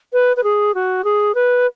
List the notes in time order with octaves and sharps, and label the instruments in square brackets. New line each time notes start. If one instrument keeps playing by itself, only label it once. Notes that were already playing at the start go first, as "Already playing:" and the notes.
[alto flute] B4
B4
G#4
F#4
G#4
B4